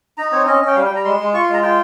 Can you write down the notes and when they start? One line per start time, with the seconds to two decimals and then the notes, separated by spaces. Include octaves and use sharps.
0.17 D#4 A#5
0.32 C4 C#5
0.46 C#4 D#5
0.62 C#4
0.67 G5
0.76 G3 F5
0.85 G5
0.91 G3 A#5
1.05 G#3 C6
1.20 G#3
1.34 F4 C#6
1.43 C6
1.48 G#3
1.54 A#5
1.63 F4 G5